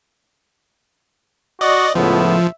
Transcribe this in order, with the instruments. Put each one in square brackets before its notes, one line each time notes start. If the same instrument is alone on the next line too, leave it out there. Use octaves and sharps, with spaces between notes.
[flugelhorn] F#4 [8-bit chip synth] D5 D#5
[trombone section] C#2 A2 B3 [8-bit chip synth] F3 [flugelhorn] E5